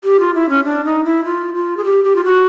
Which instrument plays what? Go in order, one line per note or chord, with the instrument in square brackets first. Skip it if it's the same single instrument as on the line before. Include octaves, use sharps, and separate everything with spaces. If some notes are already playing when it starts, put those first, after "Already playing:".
[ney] G4
F4
E4
C#4
D4
D#4
E4
F4
F4
G#4
G4
G4
F4
F#4